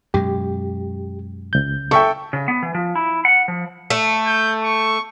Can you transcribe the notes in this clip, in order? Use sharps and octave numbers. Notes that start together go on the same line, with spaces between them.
F#2 B2 G#3 G4
C#2 G6
A4 E5 G5 C#6
C#3
B3
E3
F3
E4
F#5
F3
A3
G6
C#6